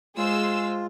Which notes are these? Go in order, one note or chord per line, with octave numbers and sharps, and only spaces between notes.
G#3 F4 G#4 C5 E6